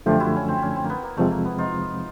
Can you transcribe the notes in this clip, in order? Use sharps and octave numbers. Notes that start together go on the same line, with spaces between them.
F#2 D3 F3 A3 D4 F4 G4
E4 F#4
C#4
C4
C#4
C4
A#3
B3
A#3
E2 C3 F3 G#3 A3 C4
A#3
B3
D#4 F4